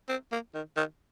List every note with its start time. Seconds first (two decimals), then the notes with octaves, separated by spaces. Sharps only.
0.09 C4
0.32 A#3
0.54 D#3
0.77 D#3